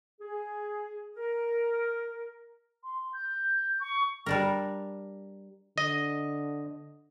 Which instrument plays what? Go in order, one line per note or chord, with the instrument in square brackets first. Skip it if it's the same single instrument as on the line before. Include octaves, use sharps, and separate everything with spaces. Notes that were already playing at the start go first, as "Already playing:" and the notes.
[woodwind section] G#4
A#4
[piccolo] C6
G6
C#6
[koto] G3 D4 A#4
[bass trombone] D3 [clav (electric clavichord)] D#5